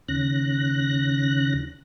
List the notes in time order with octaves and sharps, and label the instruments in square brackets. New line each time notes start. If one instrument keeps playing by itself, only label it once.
[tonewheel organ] D#2 C#3 F#6 A#6